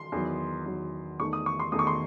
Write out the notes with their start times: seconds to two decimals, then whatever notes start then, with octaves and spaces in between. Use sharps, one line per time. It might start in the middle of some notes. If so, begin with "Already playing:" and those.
Already playing: C6
0.12 E2 D#3 F#3
0.66 E2 D#3 F#3
1.20 E2 D#3 A3 D#4 C#6
1.33 D#6
1.46 C#6
1.60 C6
1.72 E2 D#3 A3 D#4 D#6
1.79 C#6
1.87 C6